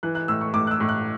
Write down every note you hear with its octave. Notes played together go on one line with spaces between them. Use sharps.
E3 F#6
F#6
A2 E6
C#6
A2 D6
F#6
E6
A2
F#6